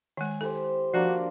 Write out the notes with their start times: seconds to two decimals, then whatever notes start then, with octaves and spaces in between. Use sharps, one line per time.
0.17 D#3 G#3 G#5
0.41 E4 G4 A4 C5
0.94 F3 A#3 D4 F4 F#4